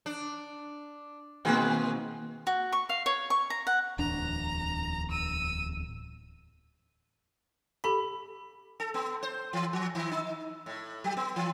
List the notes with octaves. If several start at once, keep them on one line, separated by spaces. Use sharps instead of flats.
D4
B2 D#3 G#3 A#3 C4 B4
F#4
C#6
F5
C#5
C#6
A#5
F#5
D1 E2 D4 A#5
E6 D#7
G4 A4 B5 B6
A4
B3
C5
E3
F3
D#3
D#4
A2
F#3
B3
E3